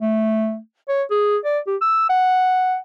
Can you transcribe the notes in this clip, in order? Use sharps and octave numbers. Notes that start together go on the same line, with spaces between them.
A3
C#5
G#4
D5
G4
E6
F#5